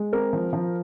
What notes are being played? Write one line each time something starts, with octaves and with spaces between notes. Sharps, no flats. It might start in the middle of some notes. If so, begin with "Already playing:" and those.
Already playing: G#3
C4 A#4
F3
F3